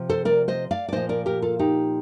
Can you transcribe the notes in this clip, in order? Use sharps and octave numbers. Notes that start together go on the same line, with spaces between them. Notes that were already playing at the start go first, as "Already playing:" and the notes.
Already playing: C3 F3
A4 C5
A#4 D5
C5 D#5
D5 F5
D5
A#2 F3 C5 D#5
A#4 D5
G4 A#4
F4 A4
D#4 G4